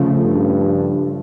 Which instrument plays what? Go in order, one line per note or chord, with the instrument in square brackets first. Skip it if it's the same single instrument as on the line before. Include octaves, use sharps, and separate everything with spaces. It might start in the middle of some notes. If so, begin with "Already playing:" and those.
Already playing: [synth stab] C#3 F3 A3
[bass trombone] G2